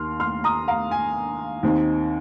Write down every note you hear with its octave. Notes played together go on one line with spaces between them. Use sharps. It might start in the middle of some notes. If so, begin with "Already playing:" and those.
Already playing: D#2 D#3 A#3 C6 F6
C6 F6
A#5 D#6
F5 A#5
G#5
D#2 D#3 C4 D#4